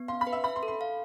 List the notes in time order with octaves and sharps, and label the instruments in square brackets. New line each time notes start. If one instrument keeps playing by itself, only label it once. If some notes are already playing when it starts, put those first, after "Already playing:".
Already playing: [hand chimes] B3
[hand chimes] F5 [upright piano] C6
[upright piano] B5
[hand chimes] B4
[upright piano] E5
[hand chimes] E5 [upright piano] B5
[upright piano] C6
[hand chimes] A4
[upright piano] C6
[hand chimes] F5